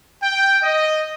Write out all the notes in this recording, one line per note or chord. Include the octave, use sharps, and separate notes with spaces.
G5
D#5